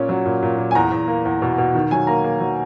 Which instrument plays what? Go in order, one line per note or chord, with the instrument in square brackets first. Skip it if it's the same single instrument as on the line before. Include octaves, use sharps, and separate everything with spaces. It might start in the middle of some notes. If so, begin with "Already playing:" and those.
Already playing: [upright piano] A#2 C#4
F#3
A#2
A#2
A#2
G#5
E2 A#5
E2
A#3
E2
B2
B2
D#3
F#3 G#5
A#3 A#5
A#3
F#3